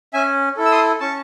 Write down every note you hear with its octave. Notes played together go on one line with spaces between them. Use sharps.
C#4 E5 G#5
E4 A4
E6
C6 D#6
C#4 A5 C#6